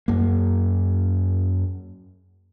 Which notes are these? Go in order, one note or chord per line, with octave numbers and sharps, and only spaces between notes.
F#2 A#3